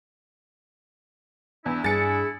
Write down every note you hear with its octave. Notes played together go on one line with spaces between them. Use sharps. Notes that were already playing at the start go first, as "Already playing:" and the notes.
E2 D4 E4
G2 G#4 G#5 A6 C#7